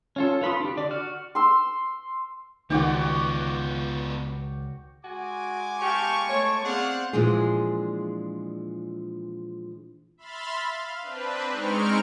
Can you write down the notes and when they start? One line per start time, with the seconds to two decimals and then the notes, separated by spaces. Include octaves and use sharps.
0.16 C#4 F4 A4
0.41 F4 B4 B5 C6 D#6
0.60 D4 G4
0.77 D3 D5 D6
0.91 F#4 F6
1.35 C6 E6
2.70 C#2 D#3 B3 F4 F#4 D5 F#5 G5
5.04 G#3 F#4 G#5 D6
5.82 G4 F5 A5 C#6
6.29 A3 C#5 A5
6.65 C4 G#4 C5 D5 F5 F#5
7.13 A#2 E3 F3 G#3 D4 G#4
10.17 E5 B5 C6 F6 A6
10.69 F5
11.02 C4 D4 B4
11.48 G#3 C4 D#4 C#6 F6 D7